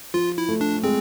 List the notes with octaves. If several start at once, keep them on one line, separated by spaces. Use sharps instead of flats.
F3 F4
E4
A3
D4
G#3 C4